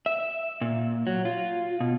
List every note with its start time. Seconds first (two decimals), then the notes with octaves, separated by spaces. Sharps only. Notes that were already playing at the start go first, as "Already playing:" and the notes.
0.06 E5
0.61 A#2
1.07 F#3
1.25 F4
1.80 B2